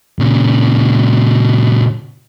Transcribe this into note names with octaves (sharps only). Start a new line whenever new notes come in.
A#2 C#3